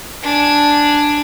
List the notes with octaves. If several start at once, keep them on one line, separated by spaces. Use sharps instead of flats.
D4 G#5